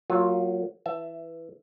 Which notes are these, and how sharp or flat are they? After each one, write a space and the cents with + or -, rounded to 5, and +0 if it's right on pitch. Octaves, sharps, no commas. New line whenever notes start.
F#3 +0 A#3 -25 F4 +15
E3 +5 E5 +15 A5 +0